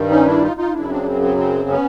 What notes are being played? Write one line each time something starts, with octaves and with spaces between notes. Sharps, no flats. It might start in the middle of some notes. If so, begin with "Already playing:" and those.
Already playing: G2 D#3 G3
C#4 D#4
D4 E4
D#4 F4
D#4 F4
F#2 C#3 F#3 D4 E4
C4 D4
C4
C4
C4
B3 C#4